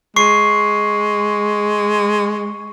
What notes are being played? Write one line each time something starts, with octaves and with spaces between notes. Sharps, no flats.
G#3 C#6 C7